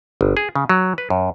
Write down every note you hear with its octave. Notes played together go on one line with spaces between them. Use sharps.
G1
G#4
C#3
F#3
B4
F#2